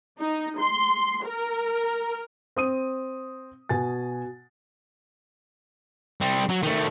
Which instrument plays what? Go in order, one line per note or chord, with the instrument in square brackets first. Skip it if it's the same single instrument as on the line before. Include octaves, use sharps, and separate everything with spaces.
[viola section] D#4
C6
A#4
[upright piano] C4 D#6 D#7
B2 G#5 A6
[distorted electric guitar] G3 C4
F#3
D#3 A3